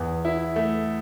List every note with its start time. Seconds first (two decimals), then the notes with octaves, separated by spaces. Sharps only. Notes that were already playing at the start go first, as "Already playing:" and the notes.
Already playing: E2
0.25 E4
0.56 A3